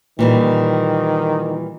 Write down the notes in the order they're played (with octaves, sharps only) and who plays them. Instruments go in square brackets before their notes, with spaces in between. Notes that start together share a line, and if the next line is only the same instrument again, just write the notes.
[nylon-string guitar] A#2 E3 G3 [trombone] D#3